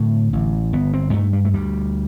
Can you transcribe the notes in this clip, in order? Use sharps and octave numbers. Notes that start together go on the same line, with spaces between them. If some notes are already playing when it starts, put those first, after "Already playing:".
Already playing: A2 D3 A3
A1
G1 B3
C4
G2 A3
G3
A3
D2 G3